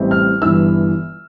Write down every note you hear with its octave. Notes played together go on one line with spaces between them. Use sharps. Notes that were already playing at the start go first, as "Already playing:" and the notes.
Already playing: A1 A2 G3 C4
F6
G1 G2 E3 E6